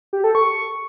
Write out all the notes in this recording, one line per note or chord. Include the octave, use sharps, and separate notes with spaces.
G4
A4
C#6